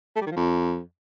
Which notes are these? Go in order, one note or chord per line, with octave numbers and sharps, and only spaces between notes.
A3
G3
D#3
F3
F2